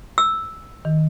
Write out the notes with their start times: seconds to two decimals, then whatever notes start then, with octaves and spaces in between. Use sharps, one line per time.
0.18 E6
0.85 D#3